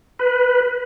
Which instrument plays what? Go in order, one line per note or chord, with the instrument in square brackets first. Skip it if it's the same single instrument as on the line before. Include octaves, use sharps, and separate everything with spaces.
[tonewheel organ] B4